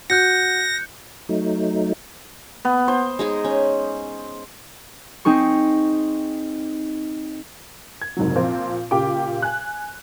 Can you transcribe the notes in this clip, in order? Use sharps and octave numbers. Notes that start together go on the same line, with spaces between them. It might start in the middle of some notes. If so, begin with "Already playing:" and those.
F#4 F#6 G6 A#6 C#7
F#3 A3 D#4
B3
C5
G#3 D#4 G#4
C#4
C4 D#4 G#4 C#6
G#6
F#1 G#2 C3 F#3
A#2 F3 C4
A#2 C#3 G4 G5 D6
G#5 F#6